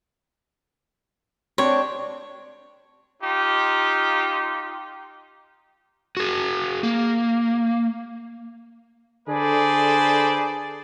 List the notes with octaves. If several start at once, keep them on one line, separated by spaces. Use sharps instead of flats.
C4 D4 C#5
D#4 F4 G4
F#4 G#4
A#3
D3 G#4 A4 B4 C5 D5